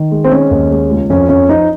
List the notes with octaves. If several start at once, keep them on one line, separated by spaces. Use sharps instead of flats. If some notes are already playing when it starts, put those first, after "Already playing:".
Already playing: D#3
G#3
C4
G#3 C#4
D#2
G#3
C#2
F2 C#4
F2 C#4
F3 D#4